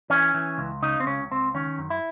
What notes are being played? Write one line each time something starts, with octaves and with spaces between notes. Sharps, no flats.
E3 C#4
E3
C#2
C#3 D#4
C4
C#2 C#4
C#2 C4
D#3 C#4
F#2
E4